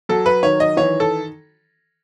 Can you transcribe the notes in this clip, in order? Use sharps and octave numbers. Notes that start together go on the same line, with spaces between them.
F#3 A4
B4
D#3 C#5
D#5
E3 C#5
A4